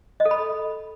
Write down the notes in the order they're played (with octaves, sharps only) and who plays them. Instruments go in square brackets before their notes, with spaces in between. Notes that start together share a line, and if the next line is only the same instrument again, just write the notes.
[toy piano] D#5
A4
B5